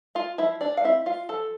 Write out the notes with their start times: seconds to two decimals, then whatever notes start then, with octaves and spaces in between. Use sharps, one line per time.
0.15 F4 F5
0.38 F3 E4 E5
0.61 D4 D5
0.77 F5
0.84 C4 E4 E5
1.06 F4 F5
1.29 F3 A4 A5